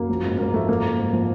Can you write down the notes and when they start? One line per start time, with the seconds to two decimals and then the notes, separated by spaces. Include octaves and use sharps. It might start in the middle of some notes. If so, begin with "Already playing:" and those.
Already playing: F#2 A#3
0.09 F3
0.24 G#2
0.38 G#2 A#3
0.54 F3 A3
0.69 F3 A#3
0.84 G#2
0.98 G#2
1.13 F3